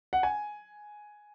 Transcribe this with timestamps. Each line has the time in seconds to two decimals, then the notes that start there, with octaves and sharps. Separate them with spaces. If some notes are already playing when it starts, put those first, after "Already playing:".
0.13 F#5
0.23 G#5